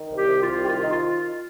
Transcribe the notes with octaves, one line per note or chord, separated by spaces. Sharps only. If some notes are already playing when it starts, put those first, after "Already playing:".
Already playing: D#3
C2
G4
C3
F4
C2
G4
D#3 F4
D#4
F4